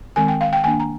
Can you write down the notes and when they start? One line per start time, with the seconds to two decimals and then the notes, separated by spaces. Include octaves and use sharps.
0.16 D#3 G#3 C4 G#5
0.28 G5
0.41 F5
0.53 G5
0.64 D#3 A#3 D4 G#5
0.80 A#5